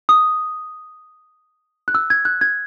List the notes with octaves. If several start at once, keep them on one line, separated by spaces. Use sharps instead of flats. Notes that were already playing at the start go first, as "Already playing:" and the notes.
D#6
F#6
E6
G#6
F#6
G#6